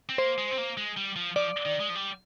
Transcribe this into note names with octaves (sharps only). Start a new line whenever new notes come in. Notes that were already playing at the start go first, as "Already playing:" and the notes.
C4
A#3 C5
G#3
C4
A#3
G#3
G3
F3
F3 D5
D#3
G#3
F3
G3